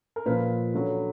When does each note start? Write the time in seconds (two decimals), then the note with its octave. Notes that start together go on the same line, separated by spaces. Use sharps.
0.16 A#4
0.26 A#2 F3 B4
0.74 D3 F#3